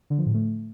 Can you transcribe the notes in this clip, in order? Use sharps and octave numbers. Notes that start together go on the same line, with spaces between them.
D3
F3
A2
A3